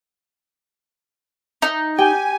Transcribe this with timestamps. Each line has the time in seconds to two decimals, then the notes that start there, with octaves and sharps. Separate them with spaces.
1.62 D#4
1.98 G4 G5 G#5